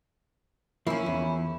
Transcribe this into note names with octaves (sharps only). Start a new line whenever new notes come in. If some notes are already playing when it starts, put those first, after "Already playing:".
F3 A#3 C#4 E4
E2